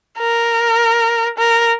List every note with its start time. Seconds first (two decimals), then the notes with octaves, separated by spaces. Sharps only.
0.19 A#4
1.38 A#4